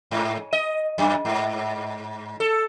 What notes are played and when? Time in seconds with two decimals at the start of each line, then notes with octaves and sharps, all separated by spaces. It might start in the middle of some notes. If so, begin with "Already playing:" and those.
0.11 G#2
0.53 D#5
0.98 F#2
1.25 G#2
2.40 A4